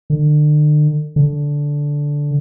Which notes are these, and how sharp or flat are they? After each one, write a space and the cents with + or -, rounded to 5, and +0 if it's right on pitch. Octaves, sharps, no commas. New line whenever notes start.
D3 +35
D3 -10